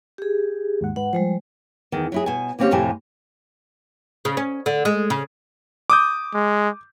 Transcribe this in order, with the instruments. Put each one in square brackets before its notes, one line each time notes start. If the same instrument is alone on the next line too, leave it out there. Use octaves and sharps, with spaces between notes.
[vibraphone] G4 G#4
[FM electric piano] D#2 G#2 F#5
[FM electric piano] G#2 B4 [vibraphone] F#5
[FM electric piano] F3 [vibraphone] G3 G#3 C5
[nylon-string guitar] E2 D#3
F#3 E4 G#4
B2 G#5
D3 A#3 C4 C#4 G4
F2 A2 C3 G4 G#5
[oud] C#3
C#4
D3
G#3
C#3
[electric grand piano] D6 D#6 G6
[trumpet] G#3